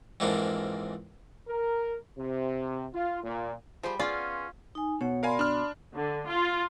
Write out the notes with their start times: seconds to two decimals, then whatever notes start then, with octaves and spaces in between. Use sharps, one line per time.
0.20 F2 G#2 E3 A#3 D4
1.48 A#4
2.17 C3
2.94 F4
3.24 A#2
3.83 F3 G3 G#4 C5
3.99 B3 C#4 F4 G#4 D5
4.75 D#4 G#5
5.01 B2 C#5 F#5
5.23 A#4 D5 F5 G#5 B5 C6
5.39 D4 F6
5.95 D3
6.30 F4